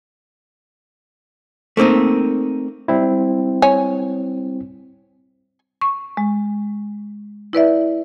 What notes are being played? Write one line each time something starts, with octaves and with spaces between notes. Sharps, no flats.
A3 A#3 C4 D#4
G3 C4 E4
C#5 G#5
C#6
G#3
E4 B4 D5 E5